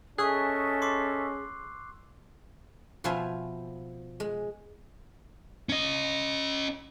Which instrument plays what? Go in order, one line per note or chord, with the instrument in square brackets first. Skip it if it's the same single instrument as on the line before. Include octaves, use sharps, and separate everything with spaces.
[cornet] C#4 [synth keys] G#4 [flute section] A4 D#5 E5 [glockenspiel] C#6 E6 F#6
[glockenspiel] C6 D6 C7
[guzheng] B2 F3 F4 C5 E5 G#5
G#3
[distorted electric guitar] C#4 D#5